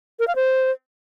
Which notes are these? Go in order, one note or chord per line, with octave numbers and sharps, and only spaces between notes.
A#4
F5
C5